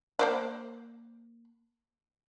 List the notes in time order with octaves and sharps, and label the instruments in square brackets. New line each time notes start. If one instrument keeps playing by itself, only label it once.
[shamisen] A#3 C5 D5